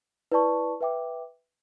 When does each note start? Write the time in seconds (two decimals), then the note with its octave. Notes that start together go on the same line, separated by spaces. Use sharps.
0.32 E4 B4 D5 A5 C#6
0.81 B4 E5 G5 D6